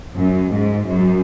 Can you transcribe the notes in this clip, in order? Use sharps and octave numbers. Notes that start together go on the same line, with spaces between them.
F#2
G#2
F#2